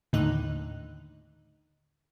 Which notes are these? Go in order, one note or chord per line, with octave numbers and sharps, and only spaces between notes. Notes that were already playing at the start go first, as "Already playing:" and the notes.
D#2 A2 D3 D#4 F#6